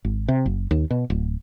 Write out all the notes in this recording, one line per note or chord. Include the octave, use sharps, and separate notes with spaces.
G#1
C3
F#1
D#2
B2
D1